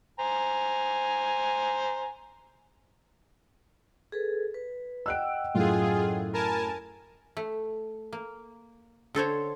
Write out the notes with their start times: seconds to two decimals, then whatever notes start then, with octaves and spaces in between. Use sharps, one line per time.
0.19 C5 G#5 A#5
4.12 G#4 A4 B4
4.54 B4
5.06 D#5 F#5 G5 E6 F#6 D7
5.54 F#2 A2 F4 G#4
6.34 A#4 G#5 A5 B5
7.37 A3
8.13 A#3
9.15 D3 A4 C5 C#5